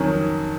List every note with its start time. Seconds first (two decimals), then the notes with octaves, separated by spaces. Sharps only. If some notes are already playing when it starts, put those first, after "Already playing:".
Already playing: F2 D#3 F#3 C#4